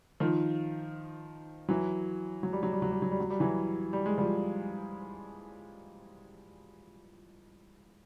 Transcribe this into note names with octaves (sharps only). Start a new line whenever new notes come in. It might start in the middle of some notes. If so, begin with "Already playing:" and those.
D#3 F3
E3 F#3
F#3
G3
F#3
G3
F#3
G3
F#3
G3
F#3
G3
E3 F#3
G3
G#3
F3 G3